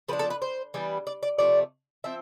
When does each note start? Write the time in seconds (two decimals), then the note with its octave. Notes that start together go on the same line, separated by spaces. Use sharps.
0.08 F3 B3 D4 B4
0.19 A4
0.30 B4
0.42 C5
0.74 E3 G3 B3 D4
1.07 D5
1.23 D5
1.39 C3 F3 A3 D5
2.04 F3 C4 E5